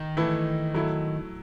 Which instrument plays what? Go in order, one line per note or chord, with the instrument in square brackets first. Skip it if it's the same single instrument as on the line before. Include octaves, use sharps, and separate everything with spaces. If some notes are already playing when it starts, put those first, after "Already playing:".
Already playing: [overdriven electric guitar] D#3
[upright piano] E3 A3 E4 A4
F#3 A3 E4